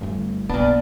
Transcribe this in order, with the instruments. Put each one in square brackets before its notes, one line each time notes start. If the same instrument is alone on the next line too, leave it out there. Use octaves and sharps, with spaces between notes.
[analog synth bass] G1 [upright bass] G3 A3
[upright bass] B1 A#3 [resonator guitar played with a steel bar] A#2 D4 [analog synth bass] B3